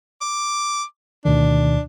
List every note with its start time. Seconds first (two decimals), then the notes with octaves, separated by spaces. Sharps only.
0.21 D6
1.25 D2 B2 D#3 D4